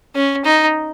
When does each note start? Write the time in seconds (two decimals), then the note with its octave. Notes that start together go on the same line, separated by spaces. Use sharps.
0.15 C#4
0.45 D#4